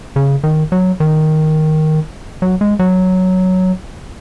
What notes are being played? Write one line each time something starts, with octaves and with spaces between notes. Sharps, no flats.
C#3
D#3
F#3
D#3
F#3
G#3
F#3